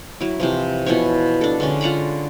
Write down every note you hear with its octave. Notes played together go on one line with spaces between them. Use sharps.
F#3 E4
C3 E3 F3
B2 E3 F3 C#5
D4 A4
D3 G#3 C#4
F4 F#5 A#5 B5